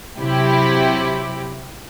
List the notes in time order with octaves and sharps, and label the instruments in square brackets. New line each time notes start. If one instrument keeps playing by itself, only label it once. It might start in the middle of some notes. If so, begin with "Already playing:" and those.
[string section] C3 F#3 E4 G4